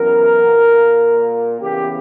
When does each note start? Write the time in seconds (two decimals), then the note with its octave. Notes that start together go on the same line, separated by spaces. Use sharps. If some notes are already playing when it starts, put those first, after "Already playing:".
Already playing: F#2 E3 B3 A#4
0.43 A#2 A#3
1.61 C#3 E3 B3 G4